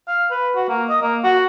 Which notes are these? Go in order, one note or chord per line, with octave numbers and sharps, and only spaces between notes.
F5
B4
F#4
A#3
D#5
A#3
F#4